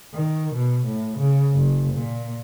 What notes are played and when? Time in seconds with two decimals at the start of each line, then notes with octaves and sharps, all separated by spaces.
0.14 D#3
0.54 B2
0.86 A2
1.19 C#3
1.54 F#1
1.93 A#2